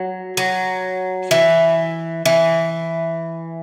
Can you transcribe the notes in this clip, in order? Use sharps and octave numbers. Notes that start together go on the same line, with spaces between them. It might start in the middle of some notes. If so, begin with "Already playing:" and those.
Already playing: F#3
F#3
E3
E3